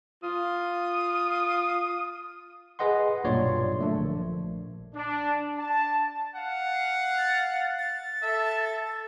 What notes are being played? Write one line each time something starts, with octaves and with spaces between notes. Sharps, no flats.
F4 D#6
G#4 B4 D#5 F#5 C6
B1 G2 A#2 C#5 D5 C6
D3 A3 D4
A#1
D4
A5
F5 F#5
A6
A6
A4 E5